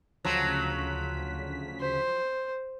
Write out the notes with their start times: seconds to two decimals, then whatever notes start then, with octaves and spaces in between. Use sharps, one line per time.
0.25 D2 C#3 F3 F#3 B6
1.80 C5